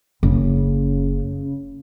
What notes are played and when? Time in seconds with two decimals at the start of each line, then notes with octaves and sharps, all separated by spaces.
0.23 F#1 C#3